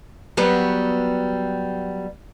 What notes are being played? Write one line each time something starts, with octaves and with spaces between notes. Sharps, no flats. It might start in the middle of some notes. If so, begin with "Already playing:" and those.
F#3 G3 B3